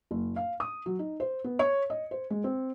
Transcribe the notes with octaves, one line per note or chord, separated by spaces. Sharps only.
F#1
F5
D#6
F#3
D#4
C5
B3
C#5
D#5
C5
G#3
C4